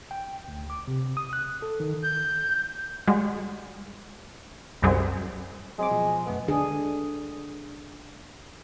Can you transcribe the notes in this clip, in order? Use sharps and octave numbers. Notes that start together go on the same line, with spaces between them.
G5
D2
D6
C3
D#6
F#6
A4
D#3
G6
G3 G#3 F#4
C2 F#2 G3 C4 G#4
F#3 G#3 C4 D6
B2 F3
F#2 A3 B3 A4
D3 D4 G#4